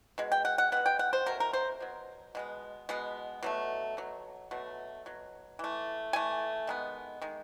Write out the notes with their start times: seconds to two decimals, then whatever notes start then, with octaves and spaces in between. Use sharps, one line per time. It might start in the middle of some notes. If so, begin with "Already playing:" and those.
0.18 B2 G#3
0.32 G5
0.45 F#5
0.58 F#5
0.72 B2 G#3 B3 F#5
0.86 G5
0.99 F#5
1.13 C5
1.26 B2 F#3 A3 A#4
1.40 A#4
1.53 C5
1.80 B2 F#3
2.35 B2 G#3 B3
2.89 B2 G#3 B3
3.43 B2 F#3 A3
3.97 B2 F#3
4.51 B2 F#3 A3
5.06 B2 F#3
5.59 E3 A3
6.13 E3 A3 G#5
6.67 D#3 G#3 B3
7.22 D#3 G#3